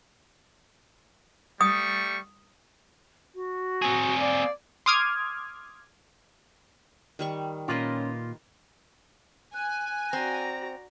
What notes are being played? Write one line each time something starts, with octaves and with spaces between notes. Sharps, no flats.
G3 A3 C#6 D#6
F#4
C4 G#4
D5 F5
C6 D6 D#6 F6 G#6
D#3 G3 C#6
A#2 C#4 F4 A#4 B4 D#5
G#5 F#6
C4 F#4 D5 A#5